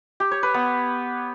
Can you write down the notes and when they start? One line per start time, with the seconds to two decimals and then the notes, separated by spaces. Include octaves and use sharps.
0.20 G4
0.31 C#5
0.43 B4
0.54 B3